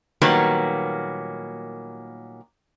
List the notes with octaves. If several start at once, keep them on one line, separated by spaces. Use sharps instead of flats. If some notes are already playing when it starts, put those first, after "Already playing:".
A#2 D#3 F#3 G3 A#3 B3